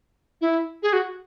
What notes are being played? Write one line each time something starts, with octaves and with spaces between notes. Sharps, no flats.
E4
G#4
F#4